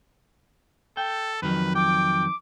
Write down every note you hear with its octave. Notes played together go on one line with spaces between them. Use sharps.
A4 G5
F2 D#3 F#3 B4
G5 D6